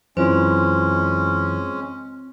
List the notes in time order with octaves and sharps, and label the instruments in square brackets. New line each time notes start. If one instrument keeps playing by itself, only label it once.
[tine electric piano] F#2 E3 [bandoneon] G#3 C#4 [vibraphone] C4 [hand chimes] F4 C5